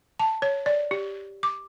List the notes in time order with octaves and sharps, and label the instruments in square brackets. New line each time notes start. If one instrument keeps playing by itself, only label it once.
[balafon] A5
C#5
D5
G4
D6